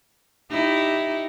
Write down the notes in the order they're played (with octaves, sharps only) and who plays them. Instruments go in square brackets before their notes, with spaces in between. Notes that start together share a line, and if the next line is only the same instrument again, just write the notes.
[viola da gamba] D#4 E4 G4